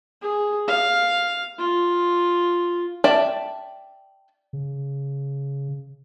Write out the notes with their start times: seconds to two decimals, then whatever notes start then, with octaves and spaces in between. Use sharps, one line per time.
0.22 G#4
0.68 F5
1.58 F4
3.04 D5 E5 G5 A5
4.53 C#3